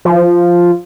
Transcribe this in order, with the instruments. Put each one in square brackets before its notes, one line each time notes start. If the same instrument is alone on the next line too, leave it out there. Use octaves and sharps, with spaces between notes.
[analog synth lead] F3